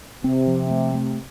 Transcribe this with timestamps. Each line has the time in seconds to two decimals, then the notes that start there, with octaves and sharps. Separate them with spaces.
0.24 C3 C4
0.47 F3
0.70 A3
0.94 A3